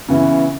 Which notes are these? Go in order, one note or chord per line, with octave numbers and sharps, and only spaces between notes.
C#3 E3 B3 E4